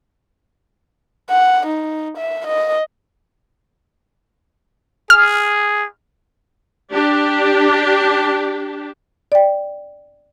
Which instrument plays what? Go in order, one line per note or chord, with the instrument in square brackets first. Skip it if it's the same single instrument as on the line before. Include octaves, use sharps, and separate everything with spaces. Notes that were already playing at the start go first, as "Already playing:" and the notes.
[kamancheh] F#5
D#4
E5
D#5
[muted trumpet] G#4 [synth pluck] F6
[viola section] D4 G4
[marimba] D5 G5